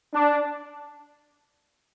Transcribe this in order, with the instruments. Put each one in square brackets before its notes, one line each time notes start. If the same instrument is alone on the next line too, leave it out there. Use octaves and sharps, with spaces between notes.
[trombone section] D4